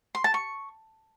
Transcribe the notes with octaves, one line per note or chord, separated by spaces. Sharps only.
C6
A5
C#6